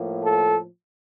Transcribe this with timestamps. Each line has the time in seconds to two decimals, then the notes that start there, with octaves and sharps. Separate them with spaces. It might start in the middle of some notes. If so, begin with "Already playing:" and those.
Already playing: A2 F3 A#3
0.23 A4